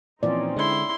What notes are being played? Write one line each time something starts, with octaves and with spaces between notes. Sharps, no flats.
A#2 E3 F3 C4 C#4 D#4 D5
D3 G#3 E4 C6